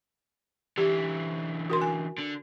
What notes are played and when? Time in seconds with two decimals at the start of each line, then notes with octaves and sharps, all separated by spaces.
0.78 D3 E3 G4
1.70 F#4 A#4 C6
1.82 G#5
2.18 D3